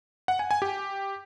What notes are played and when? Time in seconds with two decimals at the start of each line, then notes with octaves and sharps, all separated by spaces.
0.28 F#5
0.39 G#5
0.51 G#5
0.62 G4